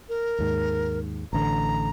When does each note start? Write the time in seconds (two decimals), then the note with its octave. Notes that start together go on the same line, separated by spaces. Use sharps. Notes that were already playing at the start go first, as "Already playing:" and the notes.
0.09 A#4
0.39 D#2 G#2
1.33 A1 D3 A#5